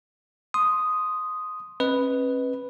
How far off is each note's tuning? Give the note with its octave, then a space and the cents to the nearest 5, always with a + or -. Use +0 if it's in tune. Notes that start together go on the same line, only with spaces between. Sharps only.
C6 +0 D#6 +0
C#4 -45 B4 +0 D#5 +0